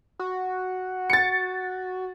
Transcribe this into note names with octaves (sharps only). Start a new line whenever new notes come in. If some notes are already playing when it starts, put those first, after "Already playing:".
F#4
A6 C#7